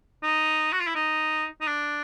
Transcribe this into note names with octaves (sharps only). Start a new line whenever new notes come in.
D#4
F#4
F4
E4
D#4
D#4
D4